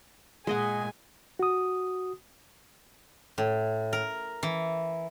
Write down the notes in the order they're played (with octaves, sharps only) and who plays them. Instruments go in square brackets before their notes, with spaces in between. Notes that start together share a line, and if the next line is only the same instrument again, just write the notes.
[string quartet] A#2 G#5 [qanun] G#3 D#5 F#5 [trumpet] G#4
[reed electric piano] F#4 D#6
[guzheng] A2
A#4
E3